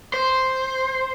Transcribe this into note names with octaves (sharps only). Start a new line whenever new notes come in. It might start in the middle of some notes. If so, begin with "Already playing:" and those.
C5